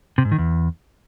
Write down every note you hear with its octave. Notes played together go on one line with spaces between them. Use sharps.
C3
G#2
D#3
E2